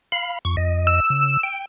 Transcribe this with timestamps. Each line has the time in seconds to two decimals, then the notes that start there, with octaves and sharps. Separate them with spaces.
0.12 F5 B5
0.45 F2 C#6
0.57 F2 D#5
0.87 E6
1.10 C#3
1.43 G5